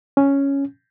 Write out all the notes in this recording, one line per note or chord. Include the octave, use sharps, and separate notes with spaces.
C#4